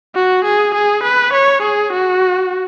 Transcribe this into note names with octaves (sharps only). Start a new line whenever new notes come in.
F#4
G#4
G#4
B4
C#5
G#4
F#4